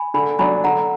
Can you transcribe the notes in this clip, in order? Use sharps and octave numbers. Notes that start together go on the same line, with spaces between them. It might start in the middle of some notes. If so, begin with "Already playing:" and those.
Already playing: G#5 B5
D3 G#5 B5
F#3 D4 G#5 B5
D3 F#5 A#5